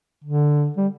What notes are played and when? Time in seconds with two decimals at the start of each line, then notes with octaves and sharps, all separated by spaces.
0.24 D3
0.77 G3